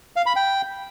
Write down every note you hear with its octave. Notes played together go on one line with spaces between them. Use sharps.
F5
B5
G5